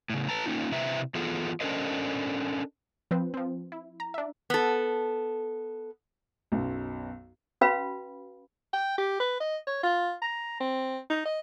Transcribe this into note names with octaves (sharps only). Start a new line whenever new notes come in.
A2 C#3
B4 A5 A#5
A#3 C4 C#4 D#4 F4
C3 E4 B4 C5 E5 A#5
E3 B3 F4 G#4 A4
C#4 D4 A4 A#4 C5 D#5
F3 C4 B4 C5
F3 C4
E4
A#5
D4 E5
B3 A4
B1 F#2
C#4 F#4 B4 F5 B5
G5
G4
B4
D#5
C#5
F4
A#5
C4
D#4
D#5